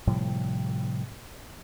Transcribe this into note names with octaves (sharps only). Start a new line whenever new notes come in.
A2 C3 F3 G3